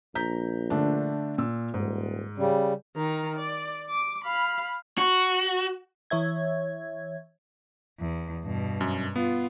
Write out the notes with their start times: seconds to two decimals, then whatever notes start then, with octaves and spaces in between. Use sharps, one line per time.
0.15 A#1 A#5 G6 B6
0.70 D3 A3 D4
1.38 A#2 E6
1.74 D#1 G#2
2.38 C#3 G3 C#4
2.96 D#3 A#5
3.37 D5
3.89 D6
4.24 F5 B5
4.98 F#4
6.10 E3 C#5 E5 G#6
8.00 E2
8.44 G2 B2
8.81 F#2
9.16 B3 F4